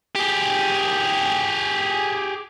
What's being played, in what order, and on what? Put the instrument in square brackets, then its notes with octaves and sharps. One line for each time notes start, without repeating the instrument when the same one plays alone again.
[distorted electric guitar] G4 G#4